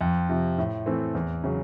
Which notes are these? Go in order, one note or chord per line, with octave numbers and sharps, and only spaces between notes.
F2
C3 F3
A2
E3 A3 C4
E2
C#3 F#3